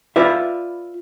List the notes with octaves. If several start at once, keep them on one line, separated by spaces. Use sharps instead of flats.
F4 B4 D5 E5